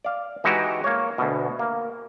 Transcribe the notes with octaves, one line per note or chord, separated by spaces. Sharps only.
D5 F5
E3 G#3 D#4 E4 F#4 G4
A#3 C#5
D2 B2
A#3